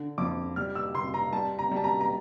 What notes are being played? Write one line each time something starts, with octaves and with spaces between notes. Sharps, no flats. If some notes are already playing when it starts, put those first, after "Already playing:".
Already playing: D3
F2 D6
G3 F6
E6
G3 C6
A#5
G3 A5
A#5
G3
A5
A#5
A#5